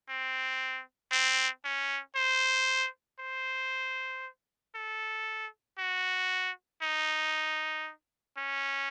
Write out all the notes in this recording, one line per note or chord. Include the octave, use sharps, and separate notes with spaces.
C4
C4
C#4
C5
C5
A4
F#4
D#4
C#4